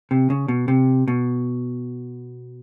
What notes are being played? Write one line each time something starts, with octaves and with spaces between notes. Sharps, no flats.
C3
C#3
B2
C3
B2